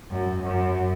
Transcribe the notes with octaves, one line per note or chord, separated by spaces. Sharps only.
F#2
F#2